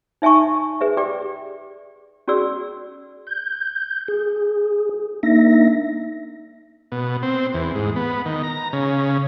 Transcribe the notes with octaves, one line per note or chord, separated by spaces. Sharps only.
D#4 E5 G#5 A5 C#6
G#4 B4 E5
G4 D5 G5 D6
C#4 F#4 G#4 D5 E6
G6
G#4
A#3 D4 D#4 E5 A#6
B2
C4
E2
G#2
B3
D#3
A#5
C#3